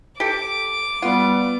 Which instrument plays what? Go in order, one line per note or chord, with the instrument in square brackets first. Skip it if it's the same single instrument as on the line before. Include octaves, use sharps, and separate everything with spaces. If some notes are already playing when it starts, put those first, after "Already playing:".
[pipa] G4 A4 [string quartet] D6
[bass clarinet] G3 [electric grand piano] B3 F#5 [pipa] F4